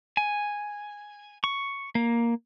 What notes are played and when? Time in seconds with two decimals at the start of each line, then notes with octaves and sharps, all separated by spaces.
0.17 G#5
1.44 C#6
1.95 A#3